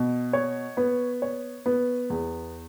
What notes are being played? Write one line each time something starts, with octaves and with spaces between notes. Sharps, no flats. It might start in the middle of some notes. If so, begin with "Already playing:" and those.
Already playing: B2
C#5
B3
C#5
B3
E2